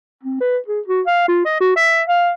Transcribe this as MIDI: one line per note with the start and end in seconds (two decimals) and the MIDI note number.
0.23 0.39 60
0.41 0.58 71
0.68 0.80 68
0.88 1.02 66
1.07 1.24 77
1.28 1.42 65
1.45 1.60 75
1.60 1.75 66
1.76 2.03 76
2.08 2.31 77